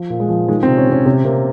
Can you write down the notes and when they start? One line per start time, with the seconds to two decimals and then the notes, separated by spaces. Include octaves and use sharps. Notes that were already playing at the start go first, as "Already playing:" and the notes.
Already playing: F3
0.10 A#2
0.20 G#3
0.29 F3
0.48 D#3 G#3
0.63 C4
0.67 C3
0.77 C#4
0.87 C3
0.92 C#4
1.06 C3 C#4
1.25 C3 A#3